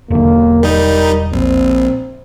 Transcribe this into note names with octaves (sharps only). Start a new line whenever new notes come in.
E1 D3 A#3
G3 D#4 A#4
A#1 C4